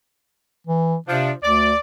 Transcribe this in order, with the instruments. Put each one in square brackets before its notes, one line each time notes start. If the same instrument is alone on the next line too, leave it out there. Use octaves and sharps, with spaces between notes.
[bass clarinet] E3
[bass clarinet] C3 [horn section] F3 D4
[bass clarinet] D2 [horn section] D5